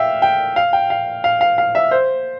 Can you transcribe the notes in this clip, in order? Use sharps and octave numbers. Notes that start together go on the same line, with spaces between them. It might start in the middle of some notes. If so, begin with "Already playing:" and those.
Already playing: E5 F5 G5
G5
F5
G5
F5
F5
F5
F5
E5
C5